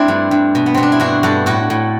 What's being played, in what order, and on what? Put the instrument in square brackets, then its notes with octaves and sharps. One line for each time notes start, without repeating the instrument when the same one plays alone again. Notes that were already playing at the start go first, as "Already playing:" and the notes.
Already playing: [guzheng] A3 C4 D4 E4
G2
G2
B2
B3
B2 C4
D4
E4
G2 D4 F#4
G2 F#4 A4
A2 F#4 A4
A2